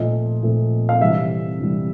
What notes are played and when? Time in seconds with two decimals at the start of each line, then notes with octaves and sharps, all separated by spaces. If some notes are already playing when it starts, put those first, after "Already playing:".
Already playing: A#2 F3 A3 D#5
0.42 A#2 F3 A3
0.89 F5
1.00 C3 E3 G3 E5
1.59 C3 E3 G3